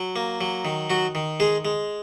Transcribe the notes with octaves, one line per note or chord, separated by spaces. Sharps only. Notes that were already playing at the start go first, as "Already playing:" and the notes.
Already playing: F#3
A#3
F#3
D#3
F#3 F#4
D#3
G#3 G#4
G#3